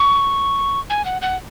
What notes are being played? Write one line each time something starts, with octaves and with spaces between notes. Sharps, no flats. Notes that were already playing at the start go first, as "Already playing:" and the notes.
Already playing: C#6
G#5
F#5
F#5